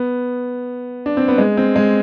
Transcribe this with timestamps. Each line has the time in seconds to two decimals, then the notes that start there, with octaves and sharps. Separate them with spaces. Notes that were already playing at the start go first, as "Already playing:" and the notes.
Already playing: B3
1.06 D4
1.17 C4
1.28 B3
1.38 G#3
1.57 C4
1.76 G#3